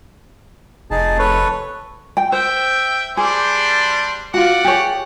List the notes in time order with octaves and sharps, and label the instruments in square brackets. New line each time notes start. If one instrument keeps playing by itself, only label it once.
[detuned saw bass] F1 [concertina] D#4 G#4 A5
[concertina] A4 B4 C#5
[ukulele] G5
[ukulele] C5 [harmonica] E5 G5
[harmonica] G3 D4 C5 [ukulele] G#4
[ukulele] F4 F#4 [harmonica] D5 F#5
[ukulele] G4 G#4 C#5